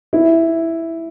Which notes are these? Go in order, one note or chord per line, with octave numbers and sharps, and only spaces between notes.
E4